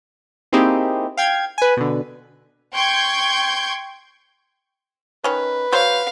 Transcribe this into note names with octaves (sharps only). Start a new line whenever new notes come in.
A#3 C4 D#4 E4 G4 G#4
F5 G5 G#6
B4 G#5
B2 D3
G5 C6 C#6 G6 G#6
D#3 C#4 B4
F#3 C5 F5 C6